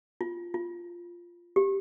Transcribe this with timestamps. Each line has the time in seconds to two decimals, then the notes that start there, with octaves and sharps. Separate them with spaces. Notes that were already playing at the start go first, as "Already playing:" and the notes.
0.21 F4
0.54 F4
1.56 G4